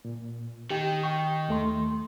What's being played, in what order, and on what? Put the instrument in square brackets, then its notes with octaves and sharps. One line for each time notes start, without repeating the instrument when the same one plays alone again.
[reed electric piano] A#2
[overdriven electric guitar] D#3 [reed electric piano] G4 G5
[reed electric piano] G5 C#6
D#2 A3 C6